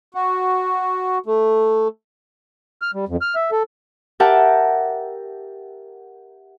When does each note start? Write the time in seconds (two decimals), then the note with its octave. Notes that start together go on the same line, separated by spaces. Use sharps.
0.14 F#4
1.26 A3
2.82 F6
2.94 G3
3.09 F2
3.21 F6
3.35 E5
3.52 A4
4.20 G4 A#4 E5 F#5 G5 A5